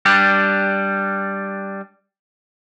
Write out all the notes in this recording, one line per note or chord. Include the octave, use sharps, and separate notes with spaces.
G3 D4 G4